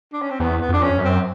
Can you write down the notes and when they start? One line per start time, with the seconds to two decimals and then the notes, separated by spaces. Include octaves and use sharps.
0.13 D4
0.22 C#4
0.31 C4
0.40 E2 B3
0.61 B3
0.69 F2 D4
0.83 C#4
0.98 F#2
1.05 C4